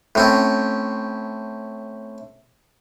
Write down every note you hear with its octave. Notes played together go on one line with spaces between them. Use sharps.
A2 C4 C#4